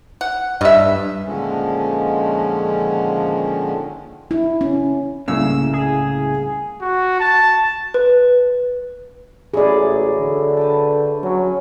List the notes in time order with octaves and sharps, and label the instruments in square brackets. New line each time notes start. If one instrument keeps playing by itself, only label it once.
[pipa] F#5
[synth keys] G2 [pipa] D#5 E5
[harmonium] A#2 D3 D#3 F3 G#3 C#4
[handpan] E4
C#4
[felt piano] C2 A#3 [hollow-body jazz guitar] A2 C#3 [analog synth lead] E6
[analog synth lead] G#4
[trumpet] F#4
A5
[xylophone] B4
[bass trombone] A1 [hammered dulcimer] F#3 E4 F#4 [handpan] G#4 D5
[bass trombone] D3
[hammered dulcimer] B4 G5 A5
[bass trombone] F#3 [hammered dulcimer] C#4